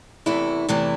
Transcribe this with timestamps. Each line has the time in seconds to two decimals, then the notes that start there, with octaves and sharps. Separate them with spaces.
0.26 E2 C3 E3 A3 E4
0.69 E2 C3 E3 A3 E4